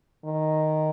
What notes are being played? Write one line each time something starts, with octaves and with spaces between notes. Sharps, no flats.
D#3